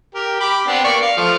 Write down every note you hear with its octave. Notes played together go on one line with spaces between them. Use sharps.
G4 A#4
G4 B5 D6
B3 C4 D4
A#3 D5 C#6
F5
F3 A3 F6